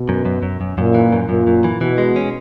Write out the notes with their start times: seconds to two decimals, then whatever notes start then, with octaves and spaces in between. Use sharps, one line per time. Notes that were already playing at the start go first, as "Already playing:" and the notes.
Already playing: B2
0.09 F#2
0.25 F#2
0.43 F#2
0.61 F#2
0.78 F#2 A#2
0.94 E3
1.12 F#2
1.29 F#2 A#2
1.47 F#2
1.64 E3
1.81 B2 E3
1.98 G#3
2.16 C#4